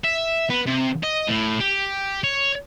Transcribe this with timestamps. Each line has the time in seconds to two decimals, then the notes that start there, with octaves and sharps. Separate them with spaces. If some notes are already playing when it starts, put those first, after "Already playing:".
0.04 E5
0.49 B3
0.66 C3
1.03 D#5
1.28 A2
1.60 G4
2.24 C#5